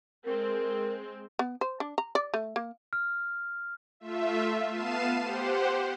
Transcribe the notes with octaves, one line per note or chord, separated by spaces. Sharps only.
G#3 C4 A#4
B3
C5
D4
A#5
D5
A3
A#3
F6
A3 F4 E5
B3 F5 A5 C7 D#7 E7
G4 C5 F#5